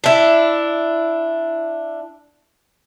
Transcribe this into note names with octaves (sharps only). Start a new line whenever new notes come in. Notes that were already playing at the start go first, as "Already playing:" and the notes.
D4 E4